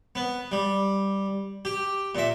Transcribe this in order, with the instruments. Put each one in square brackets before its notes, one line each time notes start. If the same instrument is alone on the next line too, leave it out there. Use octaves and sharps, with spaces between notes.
[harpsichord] B3
G3
G4
A#2 E5